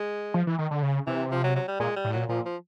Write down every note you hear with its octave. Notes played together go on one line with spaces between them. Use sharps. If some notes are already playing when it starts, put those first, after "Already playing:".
Already playing: G#3
F3
E3
D#3
D3
C#3
C3 E3
F3
F#3
F#3
G3
A#2 G#3
G3
A2
A#2 F#3
A#2 F3
F3